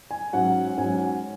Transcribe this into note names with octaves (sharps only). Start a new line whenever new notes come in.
G#5
G#2 F#3 C#4 F#5
G#2 F#3 C#4 G#5